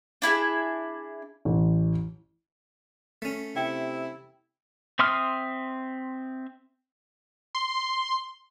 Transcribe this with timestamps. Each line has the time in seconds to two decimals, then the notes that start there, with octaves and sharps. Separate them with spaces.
0.22 D4 E4 G4 G#4
1.45 A1
3.22 A3 C#4
3.56 C3 E4 G5
4.99 C4 E5 C6 D#6 F6
7.55 C6